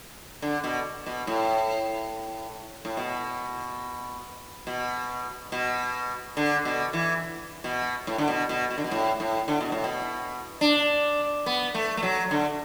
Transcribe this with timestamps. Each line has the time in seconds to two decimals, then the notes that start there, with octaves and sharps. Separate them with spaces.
0.42 D3
0.64 B2
1.06 B2
1.27 A2
2.85 A2
2.97 B2
4.67 B2
5.52 B2
6.37 D3
6.65 B2
6.93 E3
7.64 B2
8.07 A2
8.18 D3
8.28 B2
8.49 B2
8.71 B2
8.78 D3
8.84 B2
8.91 A2
9.20 A2
9.48 D3
9.61 B2
9.72 A2
9.84 B2
10.61 D4
11.46 B3
11.74 A3
11.97 A3
12.03 F#3
12.31 D3